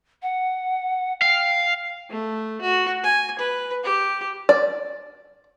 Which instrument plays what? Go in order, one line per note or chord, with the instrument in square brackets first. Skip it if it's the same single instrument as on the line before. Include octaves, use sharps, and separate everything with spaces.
[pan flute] F#5
[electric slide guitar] F5 [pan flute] G5
[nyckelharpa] A3
F#4
G#5
B4
G4
[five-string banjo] D5